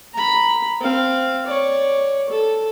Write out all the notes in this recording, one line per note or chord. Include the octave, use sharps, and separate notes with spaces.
A#5 B5
C4 F5
C#5 D5
A4